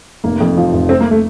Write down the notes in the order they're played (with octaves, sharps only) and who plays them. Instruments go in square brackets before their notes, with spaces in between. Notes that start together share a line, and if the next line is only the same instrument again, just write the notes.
[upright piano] F1 [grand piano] A#3
[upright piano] F2
F3
F1
[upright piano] A3 [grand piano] C4
[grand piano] A#3
A3